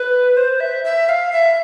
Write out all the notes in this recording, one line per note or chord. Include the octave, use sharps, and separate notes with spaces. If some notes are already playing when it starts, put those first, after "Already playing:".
Already playing: B4
C5
E5
E5
F5
E5